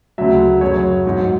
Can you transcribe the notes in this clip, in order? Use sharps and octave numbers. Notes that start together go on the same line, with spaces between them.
D2 C#3 F#3 E5
F#2 C#3 F#3 C#5
G#2 F#3